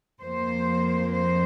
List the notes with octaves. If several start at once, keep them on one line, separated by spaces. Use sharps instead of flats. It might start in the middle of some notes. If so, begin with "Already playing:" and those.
F2 F3 A#3 C5
C5